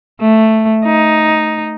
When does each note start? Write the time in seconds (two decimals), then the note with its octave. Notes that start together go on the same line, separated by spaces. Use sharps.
0.21 A3
0.86 D#4